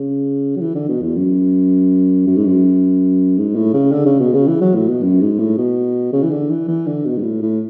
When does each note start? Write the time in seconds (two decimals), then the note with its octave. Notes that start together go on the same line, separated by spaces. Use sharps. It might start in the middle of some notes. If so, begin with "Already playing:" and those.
Already playing: C#3
0.56 F#3
0.61 E3
0.75 D3
0.89 B2
1.02 E2
1.16 F#2
2.27 F#2
2.36 G#2
2.45 F#2
3.37 G#2
3.55 A2
3.74 C#3
3.92 D3
4.05 C#3
4.20 B2
4.34 C#3
4.48 E3
4.61 F#3
4.75 A2
4.89 B2
5.03 F#2
5.21 G#2
5.39 A2
5.58 B2
6.13 C#3
6.23 E3
6.31 D3
6.50 E3
6.68 E3
6.86 D3
7.05 B2
7.18 G#2
7.23 A2
7.42 A2